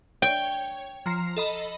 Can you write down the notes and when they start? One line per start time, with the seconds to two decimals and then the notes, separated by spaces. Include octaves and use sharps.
0.22 C#5 G5
1.06 F3 A#5 C7
1.37 A4 D#5 B5